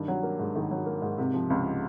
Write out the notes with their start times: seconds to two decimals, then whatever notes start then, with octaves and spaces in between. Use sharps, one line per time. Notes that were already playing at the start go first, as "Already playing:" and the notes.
Already playing: G2 D#3
0.08 F#3
0.23 A#3
0.39 G#2
0.55 D#3
0.71 F#3
0.86 A#3
1.02 G#2
1.18 C3
1.34 F3
1.50 C#2